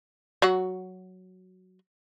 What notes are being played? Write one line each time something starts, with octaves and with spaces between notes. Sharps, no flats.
F#3 F#4